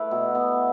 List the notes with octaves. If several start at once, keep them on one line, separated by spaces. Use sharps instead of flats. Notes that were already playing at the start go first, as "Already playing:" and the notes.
Already playing: A3 E4 B4
B2
B3